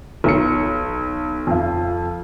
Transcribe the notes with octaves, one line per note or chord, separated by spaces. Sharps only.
B1 C#7
F2 F5